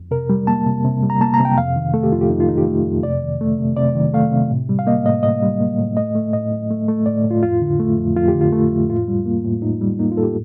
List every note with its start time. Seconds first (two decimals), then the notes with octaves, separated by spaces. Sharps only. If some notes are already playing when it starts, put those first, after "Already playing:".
Already playing: F2
0.11 C3 A#4
0.30 G3
0.47 A#3 A5
0.66 C3
0.84 C3
1.03 G3
1.10 A#5
1.21 A#3 A5
1.34 A#5
1.40 C3
1.45 G5
1.57 F2 F5
1.76 D#3
1.94 A3 A4
2.03 G4
2.12 F2 F4
2.21 G4
2.30 F2 D#4
2.40 F4
2.48 D#3 D#4
2.58 G4
2.67 A3
2.86 F2
3.03 C3 D5
3.22 D#3
3.41 A3
3.58 C3
3.77 C3 D5
3.95 D#3
4.13 A3 F5
4.32 C3
4.50 A2
4.69 G3
4.79 F5
4.87 A#3 D#5
5.05 A2 D#5
5.23 A2 D#5
5.42 G3
5.60 A#3
5.78 A2
5.97 A3 D#5
6.15 A3
6.33 A2 D#5
6.52 A2
6.70 A3
6.88 A3
7.06 A2 D5
7.24 A2
7.31 F4
7.43 F2 F4
7.62 D3
7.80 A3
7.98 F2
8.16 F2 F4
8.28 G4
8.35 D3
8.41 F4
8.52 A3
8.71 F2
8.90 A2 F4
9.08 G3
9.26 A#3
9.44 A2
9.62 A2 D#4
9.81 G3
9.99 A#3 D#4
10.12 F4
10.17 A2 A4
10.23 G4